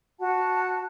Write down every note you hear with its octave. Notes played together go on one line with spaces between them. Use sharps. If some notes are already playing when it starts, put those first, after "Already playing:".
F#4 F#5 A5